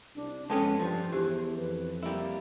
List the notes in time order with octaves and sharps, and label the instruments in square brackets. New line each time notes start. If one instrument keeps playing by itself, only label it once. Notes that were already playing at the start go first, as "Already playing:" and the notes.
[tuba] C2 [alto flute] D4
[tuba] F2 [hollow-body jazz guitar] G#3 B3 C#4 [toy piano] A4 G5 A5 [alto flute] B4
[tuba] G2 [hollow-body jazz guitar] F3 [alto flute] C5
[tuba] E2 [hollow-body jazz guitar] E3 [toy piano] G4
[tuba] F2 [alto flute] B4
[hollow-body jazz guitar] G3 E4 [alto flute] A#3